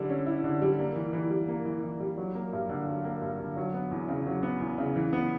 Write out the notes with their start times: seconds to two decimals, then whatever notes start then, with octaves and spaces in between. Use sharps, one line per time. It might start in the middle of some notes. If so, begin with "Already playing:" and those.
Already playing: D3 G3 E4
0.09 C#4
0.26 E4
0.44 D3
0.62 G3
0.79 A#3
0.95 E3
1.13 E3
1.31 G3
1.48 A#3
1.65 E3
1.83 E3
2.00 G3
2.18 F#3
2.35 A#3
2.53 G2
2.69 D3
2.87 F#3
3.05 A#3
3.22 G2
3.39 D3
3.57 F#3
3.74 B3
3.91 E2
4.08 C#3
4.26 F#3
4.43 B3
4.61 E2
4.78 C#3
4.96 E3
5.13 B3